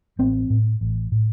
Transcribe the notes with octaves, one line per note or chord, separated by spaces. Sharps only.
A1 C4
A2
A1
A2